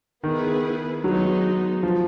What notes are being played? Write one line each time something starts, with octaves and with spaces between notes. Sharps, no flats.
D#3 B3 E4 G#4 B4
F#3 G#3 B3 D#4
F3